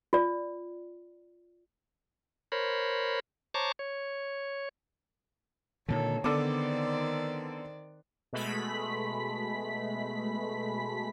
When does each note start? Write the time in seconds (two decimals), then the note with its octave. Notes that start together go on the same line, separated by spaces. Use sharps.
0.13 F4 D5
2.52 A#4 C5 C#5 B5
3.54 C5 C#5 A5 A#5 C#6 D6
3.79 C#5
5.89 A#2 D3 D#3 A4 C#5
6.24 D3 D#3 B3 C4 A4 D5 D6
8.33 B2 G#3 A3 B5 B6